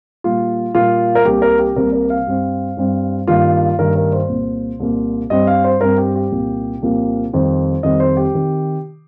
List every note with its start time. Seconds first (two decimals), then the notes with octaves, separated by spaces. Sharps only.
0.24 A#2 G3 A#3 F4
0.75 A#2 G3 A#3 F4
1.15 A#4
1.25 C2 C3 G3 A#3 G4
1.42 A#4
1.59 G4
1.76 C2 C3 G3 A#3 A#4
1.93 A#4
2.10 F5
2.27 G2 G3 C4
2.77 G2 G3 C4
3.28 G2 D#3 A#3 F4
3.79 G2 D#3 A#3 A#4
3.96 A#4
4.13 C5
4.29 C2 A#2 A#3
4.80 C2 A#2 A#3
5.30 G2 G3 C4 D#5
5.47 F5
5.64 C5
5.81 G2 G3 C4 A#4
5.98 G4
6.15 G4
6.32 C2 A#2 F3 A#3
6.82 C2 A#2 F3 A#3
7.33 F2 D#3 G3 C4
7.83 F2 D#3 G3 C4 D#5
8.00 C5
8.17 G4
8.34 C3 D#3